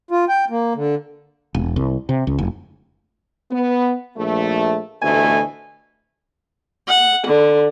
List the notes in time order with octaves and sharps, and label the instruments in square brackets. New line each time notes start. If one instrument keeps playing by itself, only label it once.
[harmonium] F4
G5
A#3
D3
[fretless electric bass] E1
C2
C3
C#2
F1
[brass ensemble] B3
A#1 A3
A1 D2 B2 A3 G#5
[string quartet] F#5
D3